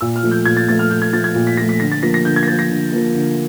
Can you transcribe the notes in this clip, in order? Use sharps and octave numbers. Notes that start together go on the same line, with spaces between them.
A#2 E6
F6
F3 A3
G6
A#2 G#6
A6
F3 A3 A6
F6
A#2 G6
G#6
F3 A3 A6
G#6
A#2
B6
F3 A3 A#6
B6
D3 A#6
A6
F3 A#3 A#6
A#6
D3 G6
G#6
A#6
F3 A#3 A6
A#6
D3
F3 A#3
D3